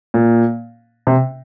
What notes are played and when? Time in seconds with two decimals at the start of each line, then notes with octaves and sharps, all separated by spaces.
0.14 A#2
1.07 C3